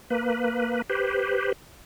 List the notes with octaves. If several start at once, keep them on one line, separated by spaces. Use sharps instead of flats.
A#3 B4
G4 B4 C5